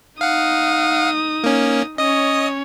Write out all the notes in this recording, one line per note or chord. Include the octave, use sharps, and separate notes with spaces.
D#4 F5 F#5 D#6
A#3 C#4
C#4 C#5 D#5 D#6